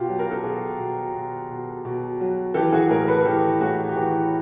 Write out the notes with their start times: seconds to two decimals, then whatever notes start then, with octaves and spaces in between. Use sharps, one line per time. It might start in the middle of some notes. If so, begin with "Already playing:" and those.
Already playing: B2 F4 G4
0.09 F#3
0.19 A#4
0.31 A4
0.43 B2 F#4 G#4
0.79 B2
1.14 B2
1.50 B2
1.85 B2
2.20 F#3
2.54 E3 G4 A4
2.73 F#4 G#4
2.90 A2 G#4 A#4
3.03 A#4
3.08 A4 B4
3.20 A#4
3.25 E3 G4 A4
3.60 A2 F#4 G#4
3.89 G4
3.96 E3 F#4 G#4